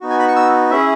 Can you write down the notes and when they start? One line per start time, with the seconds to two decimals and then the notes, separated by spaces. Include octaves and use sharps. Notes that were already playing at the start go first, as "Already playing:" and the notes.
0.01 B3 D#4 F#4
0.10 G#5
0.19 B5
0.28 C#6
0.36 E6
0.71 C#4 E4 G#4 E5